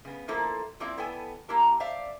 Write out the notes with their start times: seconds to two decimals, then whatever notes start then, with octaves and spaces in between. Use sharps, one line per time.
0.05 C#3 B3
0.28 F3 A#3 E4 A4 A#4 C5
0.80 F3 A#3 C4 E4 D5 E5
0.97 B3 E4 A4 G5 G#5
1.48 A#3 E4 G4 A#4 A5
1.80 C5 D5 E5 F5